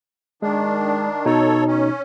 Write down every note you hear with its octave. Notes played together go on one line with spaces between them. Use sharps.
D#3 G#3 D4
B2 D#4 A4 C#5
C#4